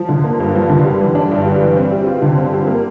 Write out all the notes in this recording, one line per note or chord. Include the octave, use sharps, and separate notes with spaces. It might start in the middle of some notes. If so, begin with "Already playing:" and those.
Already playing: F3
D3
A#3
G2
F3
D3
G3
E3
D4
G2
G3
E3
C4
G3
F4
D3
C4
G3
A#3